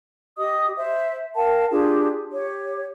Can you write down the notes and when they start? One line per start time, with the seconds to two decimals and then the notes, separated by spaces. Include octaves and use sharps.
0.37 G4 D#5 D#6
0.77 C5 E5
1.36 A#4 F5 G5 A5
1.71 D4 F4 G4 G#4
2.31 G4 C#5